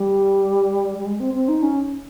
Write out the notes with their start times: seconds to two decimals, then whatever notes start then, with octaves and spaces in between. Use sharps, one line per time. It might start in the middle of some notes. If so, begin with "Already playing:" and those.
Already playing: G3
0.99 G3
1.06 G#3
1.20 C4
1.34 C4
1.48 D#4
1.63 C#4